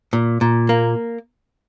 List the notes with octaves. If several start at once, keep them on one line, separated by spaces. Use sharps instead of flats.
A#2
A#2
A#3